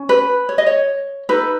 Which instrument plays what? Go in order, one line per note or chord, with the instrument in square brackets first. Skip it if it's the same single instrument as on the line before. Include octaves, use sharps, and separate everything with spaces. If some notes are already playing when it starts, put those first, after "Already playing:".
Already playing: [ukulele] C#4
B4
C#5
D#5
C#5
D#4 A4 B4